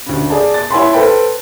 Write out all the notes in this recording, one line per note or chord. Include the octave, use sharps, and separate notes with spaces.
D2 C#3
G#4 D5 A5
A6
E4 C#5 F#5 G#5 B5 C6
A4 B4 C5 G5 A5 B5